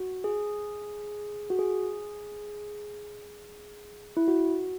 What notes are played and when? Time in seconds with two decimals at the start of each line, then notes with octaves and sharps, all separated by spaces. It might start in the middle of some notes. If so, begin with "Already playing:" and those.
Already playing: F#4
0.24 G#4
1.50 F#4
1.59 G#4
4.17 E4
4.28 F#4